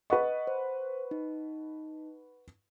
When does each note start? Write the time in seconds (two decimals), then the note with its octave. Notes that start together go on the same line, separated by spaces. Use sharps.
0.10 B4 D#5 F#5 C#6
0.47 C5
1.11 D#4